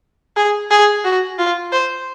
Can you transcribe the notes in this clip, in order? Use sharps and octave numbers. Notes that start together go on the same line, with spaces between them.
G#4
G#4
F#4
F4
C5